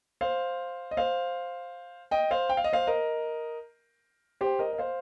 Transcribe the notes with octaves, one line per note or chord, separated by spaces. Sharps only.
C5 F5
D#5
C5 F5
D#5 G5
C5 F5
G5
F5
D#5
C5 F5
A#4 D#5
G4 C5
A#4 D#5
D#5
C5 F5